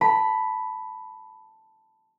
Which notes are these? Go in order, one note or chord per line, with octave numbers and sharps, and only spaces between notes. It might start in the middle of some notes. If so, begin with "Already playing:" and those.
A5 B5